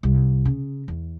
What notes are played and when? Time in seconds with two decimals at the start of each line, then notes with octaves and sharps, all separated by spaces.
0.03 C2
0.45 C#3
0.88 E2